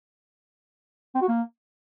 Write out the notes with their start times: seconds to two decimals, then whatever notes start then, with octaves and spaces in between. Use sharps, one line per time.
1.15 C4
1.22 F#4
1.28 A#3